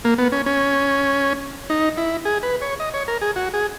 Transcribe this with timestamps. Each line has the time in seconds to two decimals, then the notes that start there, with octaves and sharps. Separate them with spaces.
0.05 A#3
0.18 B3
0.32 C#4
0.46 C#4
1.70 D#4
1.97 E4
2.25 G#4
2.43 B4
2.62 C#5
2.80 D#5
2.94 C#5
3.08 A#4
3.22 G#4
3.36 F#4
3.54 G#4